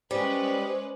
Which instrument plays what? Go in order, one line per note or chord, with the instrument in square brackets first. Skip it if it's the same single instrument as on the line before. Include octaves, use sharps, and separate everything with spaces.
[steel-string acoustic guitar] G3 [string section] G#3 C#4 B4 [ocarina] C5